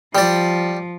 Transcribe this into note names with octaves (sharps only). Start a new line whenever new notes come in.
F3 G3 D5